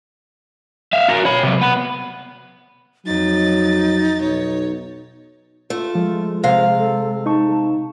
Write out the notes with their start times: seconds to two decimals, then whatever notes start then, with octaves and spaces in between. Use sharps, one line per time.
0.93 E5 F5
1.09 F#4 A#4
1.25 C#5 B5
1.43 C3 F#3
1.61 B3 B4
3.05 F2 F#3 D#4 A6
4.20 B1 C#5
5.70 A3 F4
5.95 F3 G#3
6.44 C3 F5
6.78 A4
7.26 D#4 A5 C#6